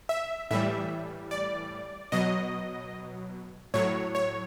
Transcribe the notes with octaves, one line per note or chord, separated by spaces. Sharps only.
E5
A2 E3 G3 E5
D5
B2 F#3 D#5
A2 F#3 C#5
C#5